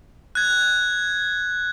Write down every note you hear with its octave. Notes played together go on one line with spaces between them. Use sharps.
F#6 G#6